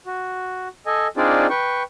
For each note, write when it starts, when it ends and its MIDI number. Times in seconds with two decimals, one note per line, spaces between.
0.06 0.68 66
0.86 1.07 69
0.86 1.07 75
0.86 1.07 80
1.17 1.47 60
1.17 1.47 62
1.17 1.47 63
1.17 1.47 65
1.17 1.47 68
1.17 1.47 74
1.50 1.83 71
1.50 1.83 79
1.50 1.83 85